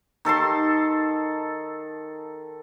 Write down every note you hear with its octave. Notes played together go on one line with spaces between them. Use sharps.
D#3 A4 A5 C6